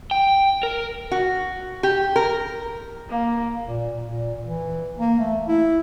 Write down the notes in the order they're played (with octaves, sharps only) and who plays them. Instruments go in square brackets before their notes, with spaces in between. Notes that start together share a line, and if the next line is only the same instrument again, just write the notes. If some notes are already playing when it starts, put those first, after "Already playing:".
[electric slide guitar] G5
A#4
[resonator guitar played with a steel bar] F#4
G4
A#4
[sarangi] A#3
[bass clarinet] A#2
A#2
E3
A#3
A3
E4